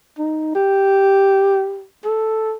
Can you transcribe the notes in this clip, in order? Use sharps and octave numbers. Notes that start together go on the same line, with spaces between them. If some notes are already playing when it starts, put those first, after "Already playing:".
D#4
G4
A4